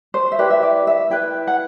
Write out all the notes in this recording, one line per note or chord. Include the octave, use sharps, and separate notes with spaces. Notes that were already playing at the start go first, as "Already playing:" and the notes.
C5
E5
E4 G4 B4 D5
E5
D5
E5
E4 B4 G5
F#5